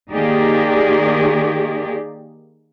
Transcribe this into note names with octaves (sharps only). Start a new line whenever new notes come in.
D#3 A#3 D#4 G4 G#4 D5